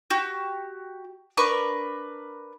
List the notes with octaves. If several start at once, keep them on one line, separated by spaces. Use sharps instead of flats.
F#4 G4
D4 A#4 B4 C#6